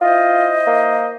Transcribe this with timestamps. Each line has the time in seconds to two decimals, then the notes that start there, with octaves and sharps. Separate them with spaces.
0.01 E4 F4 C5 D#5
0.67 A#3